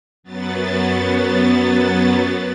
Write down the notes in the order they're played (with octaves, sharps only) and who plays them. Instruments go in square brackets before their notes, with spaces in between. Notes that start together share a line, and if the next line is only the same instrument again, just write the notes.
[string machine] F#2 F#3 B3 A6